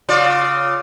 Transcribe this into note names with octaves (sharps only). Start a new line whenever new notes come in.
C#3 F4 D5